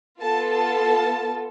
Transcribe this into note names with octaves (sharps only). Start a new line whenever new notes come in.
B3 F4 A4 A5
A5